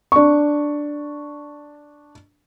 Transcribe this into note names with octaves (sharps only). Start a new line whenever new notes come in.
D4 C#6